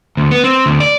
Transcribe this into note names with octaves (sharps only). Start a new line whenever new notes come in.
D2
B3
C4
D2
D5